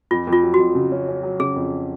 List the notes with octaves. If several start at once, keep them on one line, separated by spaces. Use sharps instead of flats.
F2 F4
F2
F4
F#3
F2 F#4
C#3
C#4
C#4
F#3
C#3 G#4
F2